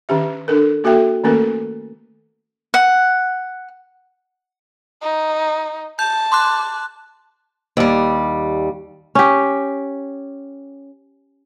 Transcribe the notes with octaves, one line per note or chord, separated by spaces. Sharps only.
D#3 C#4 G4 E5
D4 A4 A#4
A#3 F#4 A4 E5 G5
D#3 A3 A#3 C#4 A4 A#4
F#5
D#4
A5 G6
C6 D6 F#6
D#2 G3
C#4 G4